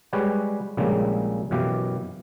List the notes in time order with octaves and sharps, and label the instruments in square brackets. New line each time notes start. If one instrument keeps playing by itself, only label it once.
[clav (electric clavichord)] G3 G#3 G4 B4 C#5 F#5
A#1 C#3 G3 G#3 A#3
F#2 B2 E3 G4 F5